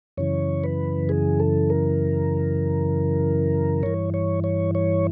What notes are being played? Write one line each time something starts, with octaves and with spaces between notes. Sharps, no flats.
F#2 C#3 E3 C#5
B4
G#4
A4
A#4
G2 E3 C#5
C#5
C#5
C#5